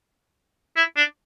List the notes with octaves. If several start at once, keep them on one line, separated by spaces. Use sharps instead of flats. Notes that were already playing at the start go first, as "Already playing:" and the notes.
E4
D4